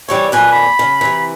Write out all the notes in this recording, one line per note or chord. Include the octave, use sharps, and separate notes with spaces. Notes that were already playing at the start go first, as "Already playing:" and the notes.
C3 E3 G3 C#5
F2 A#2 B4 G#5
B5
C#3
C3 E3